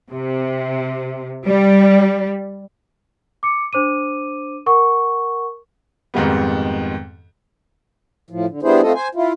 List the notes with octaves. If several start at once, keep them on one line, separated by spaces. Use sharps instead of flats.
C3
G3
D6 C#7
D4 C5 D6 D#7
A#4 F#5 C#6
F2 G#2 D#3 G3 B3
A2 F3
D3
G3 B3 D4 E4 G#4 C5
A3 C4 F4 A4 D#5
C5 G#5
E4 F4